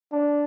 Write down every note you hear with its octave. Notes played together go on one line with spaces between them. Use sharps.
D4